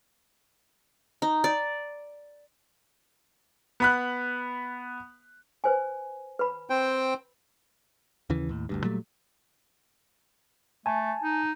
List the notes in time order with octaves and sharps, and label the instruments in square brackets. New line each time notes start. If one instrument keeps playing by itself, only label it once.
[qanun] D#4
D5
[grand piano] B3 B5 F#6
[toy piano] B4 C5 G#5
B4 B5
[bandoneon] C4 C5 G5
[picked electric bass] D#2 C#3 E3
D#2 A2
G1 D2 G2
A#2 F#3 G3 A3
[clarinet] A3 [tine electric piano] G#5 A5
[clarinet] D#4